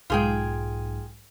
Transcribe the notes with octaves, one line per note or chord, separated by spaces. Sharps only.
B1 G#2 F4 G#4 G5